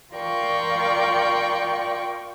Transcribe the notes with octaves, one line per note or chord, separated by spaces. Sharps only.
F4 A#4 D5 G5 C#6